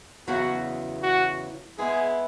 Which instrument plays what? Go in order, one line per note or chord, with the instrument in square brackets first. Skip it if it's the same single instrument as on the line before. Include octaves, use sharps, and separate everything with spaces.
[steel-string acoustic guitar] E2 C#3 F#3 [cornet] F#4
[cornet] F#4
[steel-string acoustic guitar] G#3 B3 E4 [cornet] G#4